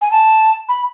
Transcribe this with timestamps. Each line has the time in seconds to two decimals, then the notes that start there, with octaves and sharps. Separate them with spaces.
0.01 G#5
0.11 A5
0.69 B5